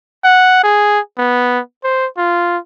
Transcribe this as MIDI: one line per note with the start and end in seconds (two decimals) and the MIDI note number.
0.24 0.60 78
0.64 1.00 68
1.18 1.60 59
1.84 2.07 72
2.18 2.58 65